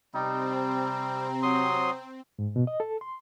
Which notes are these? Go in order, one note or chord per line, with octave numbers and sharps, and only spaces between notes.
C3 G3 C4 D#4
A#5
F#3 C6 D#6
G#2
B2
D#5
A4
C6